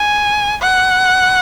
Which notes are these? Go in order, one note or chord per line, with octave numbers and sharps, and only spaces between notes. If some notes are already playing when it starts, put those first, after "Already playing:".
Already playing: G#5
F#5